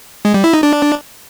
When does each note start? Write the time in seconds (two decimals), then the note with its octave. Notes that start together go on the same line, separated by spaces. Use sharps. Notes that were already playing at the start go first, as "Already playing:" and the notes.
0.25 G#3
0.34 G3
0.44 E4
0.53 D#4
0.63 D4